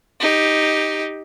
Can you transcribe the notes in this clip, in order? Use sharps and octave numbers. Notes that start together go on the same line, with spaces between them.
D#4 G4